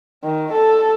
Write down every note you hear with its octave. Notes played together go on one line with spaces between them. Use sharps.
D#3
A4